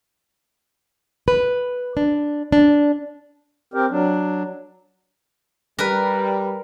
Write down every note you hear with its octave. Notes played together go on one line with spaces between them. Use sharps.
B4
D4
D4
C4 G4 A#4
F#3 D4
G3 A#4 B4